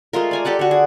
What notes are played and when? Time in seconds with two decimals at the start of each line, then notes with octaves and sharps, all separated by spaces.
0.13 G#3 A3 F4 A#4
0.31 D5 G#5 A#5
0.45 G4 A4 D5 F#5
0.59 D3 F#4
0.71 G#4